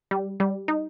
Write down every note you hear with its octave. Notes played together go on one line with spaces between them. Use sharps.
G3
G3
D#4